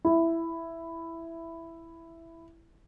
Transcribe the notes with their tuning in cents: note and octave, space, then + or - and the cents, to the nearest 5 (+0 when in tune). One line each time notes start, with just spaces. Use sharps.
E4 +5